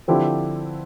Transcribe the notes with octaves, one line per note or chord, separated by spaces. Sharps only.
D3 F3 C4 E4 G4